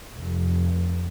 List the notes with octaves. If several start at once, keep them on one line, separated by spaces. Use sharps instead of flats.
F1